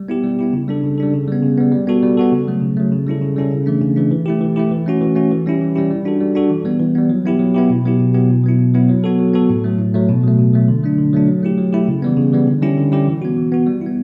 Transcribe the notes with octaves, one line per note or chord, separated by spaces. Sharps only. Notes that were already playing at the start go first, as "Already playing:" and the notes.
Already playing: G3
B3 E4 G4
G3
B3 E4 G4
C#3
G3 D4 A4
C#3
G3 D4 A4
C#3
G3 B3
C#3
G3 B3
G3
B3 F#4 A4
G3
B3 F#4 A4
C#3
F#3 A3
C#3
F#3 A3
C#3
G3 C#4 E4 A4
C#3
G3 C#4 E4 A4
C#3
E3 A3 D4
C#3
E3 A3 D4
E3
A3 E4 G4
E3
A3 E4 G4
E3
A3 C#4 F#4
E3
A3 C#4 F#4
E3
G3 C#4 E4 G4
E3
G3 C#4 E4 G4
G3
D4 F#4 A4
G3
D4 F#4 A4
E3
G3 B3
E3
G3 B3
F#3
B3 E4 G4
F#3
B3 E4 G4
B2
F#3 B3 E4 G4
B2
F#3 B3 E4 G4
B2
F#3 B3 E4
B2
F#3 B3 E4
F#3
B3 F#4 A4
F#3
B3 F#4 A4
A2
F#3 A3
A2
F#3 A3
B2
F#3 A3
B2
F#3 A3
D3
F#3 A3 D4
D3
F#3 A3 D4
F#3
A3 E4 G4
F#3
A3 E4 G4
C#3
E3 G3 B3
C#3
E3 G3 B3
D3
G3 C#4 E4 G4
D3
G3 C#4 E4 G4
E3
B3 F#4
E3
B3 F#4
G3
E4
B3